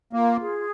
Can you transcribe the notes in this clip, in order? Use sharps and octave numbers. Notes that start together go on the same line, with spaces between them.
A#3 F4
G#4